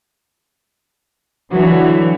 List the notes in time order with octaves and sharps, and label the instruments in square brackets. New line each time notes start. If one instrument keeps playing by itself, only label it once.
[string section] D3 E3 F#3